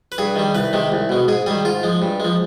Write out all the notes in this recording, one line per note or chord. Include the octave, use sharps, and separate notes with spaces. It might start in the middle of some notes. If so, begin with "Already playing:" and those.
B4
G2 G#4
D#3 G3
C2 B4
C3 D#3 G#3
C2
B2 G#3
G#2 G#4
D#3 G3 G#4
G#2 F4
F3 G#3
G2
F3 G#3